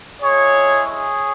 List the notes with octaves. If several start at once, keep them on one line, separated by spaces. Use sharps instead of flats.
G#3 E4 G#4 C#5
G#4 C#5